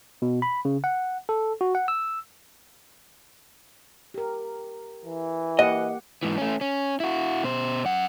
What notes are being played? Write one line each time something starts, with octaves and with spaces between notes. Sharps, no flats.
B2
B5
C#3
F#5
A4
F#4
F#5
E6
G4 A#4
E3
A#3 G4 D#5 F#5
G#2 E3
A3 C#4
C#4
E4 F#4
B2 C5
F#2 F#5